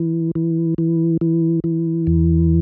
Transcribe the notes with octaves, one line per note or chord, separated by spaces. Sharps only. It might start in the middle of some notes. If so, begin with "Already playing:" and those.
Already playing: E3
E3
E3
E3
E3
E2